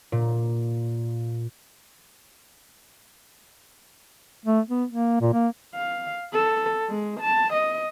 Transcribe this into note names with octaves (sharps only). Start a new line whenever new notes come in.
A#2
A3
B3
A#3
A#2
A#3
F5
A4
G#3
A5
D#5